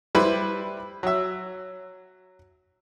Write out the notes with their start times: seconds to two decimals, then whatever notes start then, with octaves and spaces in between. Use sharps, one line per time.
0.15 G3 E4 B4 C5
1.03 F#3 E5